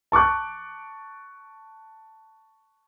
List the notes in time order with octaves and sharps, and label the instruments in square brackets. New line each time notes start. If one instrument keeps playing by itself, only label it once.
[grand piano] A5 C#6 D6 F#6